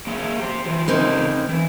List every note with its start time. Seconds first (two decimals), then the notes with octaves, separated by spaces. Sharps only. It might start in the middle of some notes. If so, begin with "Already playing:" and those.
0.07 A#3 G#4 E5
0.40 G4 C5
0.65 E3 F3
0.88 A2 C#3 A#3 C4 D#4 C5
1.49 E3